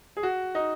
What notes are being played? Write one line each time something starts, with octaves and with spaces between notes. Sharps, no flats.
G#4
F#4
D#4